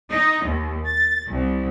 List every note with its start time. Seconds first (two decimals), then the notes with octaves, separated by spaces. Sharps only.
0.11 D#4
0.45 D#2
0.86 A6
1.29 C2